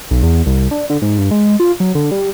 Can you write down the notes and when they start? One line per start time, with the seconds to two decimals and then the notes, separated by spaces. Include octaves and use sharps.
0.11 B1
0.23 E2
0.46 C2
0.71 D4
0.90 D3
1.02 G#2
1.18 G2
1.31 G#3
1.60 F4
1.80 F#3
1.95 D3
2.12 G3